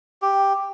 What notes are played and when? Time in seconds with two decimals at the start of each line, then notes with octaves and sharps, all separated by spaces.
0.22 G4